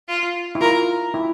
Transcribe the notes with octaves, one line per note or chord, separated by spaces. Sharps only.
F4
E4
F4 A#4
E4